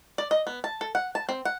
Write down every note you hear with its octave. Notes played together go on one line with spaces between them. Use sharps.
D5
D#5
B3
A5
A4
F#5
A5
C4
F#5